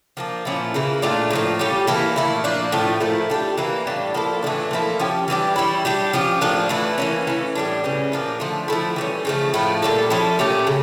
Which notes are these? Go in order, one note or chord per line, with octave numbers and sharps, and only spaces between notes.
F3 A#3 D4
A#2 F3 C#4 E4
C#3 E3 A#3 E4
A#2 A3 D4 F4
A2 F3 A#3
G3 C#4 G4
E3 A#3 E4 A4
A#2 A3 E4
A#2 F3 A#3 D4
A2 F3 A3
A#2 F3 A3 E4
G3 D4 G4
E3 A#3 E4
A2 G3 D4
F3 A#3 E4 A4
A2 E3 A3 D4
F3 A#3 E4 A4
F3 C#4 G4
E3 G3 D4 G4
G3 C#4 E4
G3 D4 G4
F3 C#4 G4
A2 F3 A#3 D4
E3 A3 E4
E3 A#3 C#4
E3 A3 C#4
A2 G3 D4
C#3 E3 G3 C#4
A#2 F3 A#3 D4
D3 F3 A3
F3 A3 E4
E3 G3 C#4
C#3 F3 A3
A2 F3 A3 E4
A#2 G3 D4 A4
F3 C#4 E4 A4
A#2 A3 C#4 G4
C#3